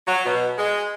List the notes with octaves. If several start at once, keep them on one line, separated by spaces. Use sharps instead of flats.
F#3
B2
G#3